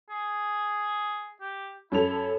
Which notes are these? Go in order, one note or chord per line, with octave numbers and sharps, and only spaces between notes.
G#4
G4
F#2 E4 A4 F7